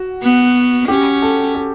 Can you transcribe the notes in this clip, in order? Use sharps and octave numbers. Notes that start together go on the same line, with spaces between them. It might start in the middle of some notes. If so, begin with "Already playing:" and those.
Already playing: F#4
B3
C#4 G4
A4
A4